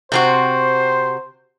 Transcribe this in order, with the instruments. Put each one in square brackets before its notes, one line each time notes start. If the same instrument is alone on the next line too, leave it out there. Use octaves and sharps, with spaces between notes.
[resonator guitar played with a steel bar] C3 C4 F#4 [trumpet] C5